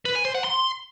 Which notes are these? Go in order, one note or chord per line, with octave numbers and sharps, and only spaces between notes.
B4
G#5
C5
F#5
C6